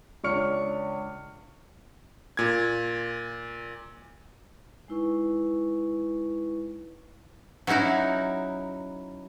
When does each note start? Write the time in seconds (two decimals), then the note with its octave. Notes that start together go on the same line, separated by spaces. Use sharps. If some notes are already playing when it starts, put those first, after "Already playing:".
0.24 C#2 D4 C#5 C#6 F6 C#7
2.37 A#2 G#6
4.88 G#3 D#4 E4 B4 C#6
7.67 F#3 C#4 D#4 E4 F#4